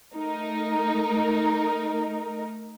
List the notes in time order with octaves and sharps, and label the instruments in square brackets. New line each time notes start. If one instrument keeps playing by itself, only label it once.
[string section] A3 D#4 A#4